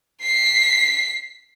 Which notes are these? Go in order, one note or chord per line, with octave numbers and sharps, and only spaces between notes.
B6 C7